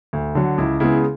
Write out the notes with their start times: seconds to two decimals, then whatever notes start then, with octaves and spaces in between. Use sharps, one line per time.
0.13 D2
0.35 D3 F#3
0.58 C#2 E4
0.80 C#3 G#3 B3 E4